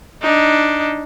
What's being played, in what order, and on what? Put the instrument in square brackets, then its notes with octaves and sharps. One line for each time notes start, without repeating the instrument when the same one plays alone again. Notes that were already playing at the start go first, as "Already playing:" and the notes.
[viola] D4 D#4